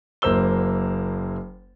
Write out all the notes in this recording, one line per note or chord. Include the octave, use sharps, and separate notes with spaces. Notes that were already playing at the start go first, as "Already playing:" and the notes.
F#1 F#2 A#3 C5 E6 G7